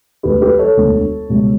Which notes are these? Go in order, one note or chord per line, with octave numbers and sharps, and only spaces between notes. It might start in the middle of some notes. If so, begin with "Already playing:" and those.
E1 D2 D3 G4 B4
G4 B4
A4 C#5
E1 D2 D3
C#2 B2 G3